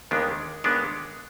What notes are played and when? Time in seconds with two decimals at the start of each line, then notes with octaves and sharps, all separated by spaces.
0.11 D#2 D#3 G#3 B3 D4
0.64 D#2 D#3 G#3 B3 D4